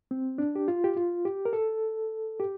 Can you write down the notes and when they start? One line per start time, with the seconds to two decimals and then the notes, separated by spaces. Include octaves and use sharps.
0.11 C4
0.38 D4
0.56 G4
0.68 F4
0.84 G4
0.97 F4
1.25 G4
1.45 A#4
1.53 A4
2.40 G4